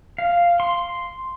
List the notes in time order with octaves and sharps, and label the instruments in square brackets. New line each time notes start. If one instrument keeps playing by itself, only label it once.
[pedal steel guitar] F5
C6